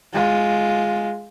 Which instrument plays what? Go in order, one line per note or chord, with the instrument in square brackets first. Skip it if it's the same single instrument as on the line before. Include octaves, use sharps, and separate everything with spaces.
[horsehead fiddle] G#3 F4